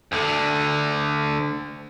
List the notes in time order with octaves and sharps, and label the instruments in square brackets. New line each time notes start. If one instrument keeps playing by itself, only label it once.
[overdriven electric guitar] D2 D3